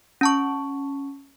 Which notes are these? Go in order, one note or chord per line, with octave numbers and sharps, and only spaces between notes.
C#4 A5 C#6